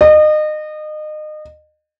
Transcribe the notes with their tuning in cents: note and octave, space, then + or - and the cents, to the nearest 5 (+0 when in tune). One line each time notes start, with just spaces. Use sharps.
D#5 -30